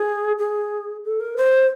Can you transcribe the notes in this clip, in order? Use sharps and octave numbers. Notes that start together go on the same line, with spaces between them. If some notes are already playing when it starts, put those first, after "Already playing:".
Already playing: G#4
G#4
A4
A#4
C5